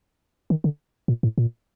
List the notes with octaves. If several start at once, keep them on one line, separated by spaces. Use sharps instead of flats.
D#3
D3
A#2
A2
A#2